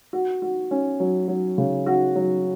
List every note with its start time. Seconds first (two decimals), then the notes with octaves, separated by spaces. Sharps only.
0.13 F#4
0.42 F#4
0.71 C#4
1.00 F#3
1.28 F#3
1.58 C#3
1.86 F#4
2.16 F#3